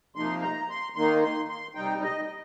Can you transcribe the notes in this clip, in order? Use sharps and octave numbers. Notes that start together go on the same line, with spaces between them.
C3 F3 A#3 D#4 C6
A#5
C6
D#3 A#3 D#4 C6
C6
C6
C3 G3 D#4 G5
D#5